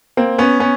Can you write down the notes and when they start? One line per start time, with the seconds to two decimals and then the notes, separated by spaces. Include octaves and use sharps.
0.17 A#3 C4
0.38 B3 C#4
0.60 B3 C#4